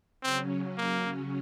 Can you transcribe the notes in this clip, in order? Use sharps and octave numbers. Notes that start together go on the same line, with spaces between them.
C#3 F#3 C4 C#4
A#3